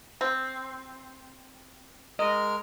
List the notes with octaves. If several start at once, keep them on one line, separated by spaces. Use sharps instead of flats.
C4
G#3 A#4 D#5 F6